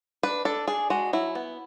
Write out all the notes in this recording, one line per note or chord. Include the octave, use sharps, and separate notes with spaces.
D4 B4
D4 A4
D4 G#4
G#3 F#4
F#3 E4
B3